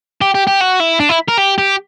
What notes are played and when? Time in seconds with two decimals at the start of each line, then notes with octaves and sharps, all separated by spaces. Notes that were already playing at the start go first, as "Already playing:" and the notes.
0.21 G4
0.34 G4
0.47 G4
0.61 F#4
0.80 E4
1.00 D4
1.09 E4
1.29 A#4
1.38 G4
1.58 G4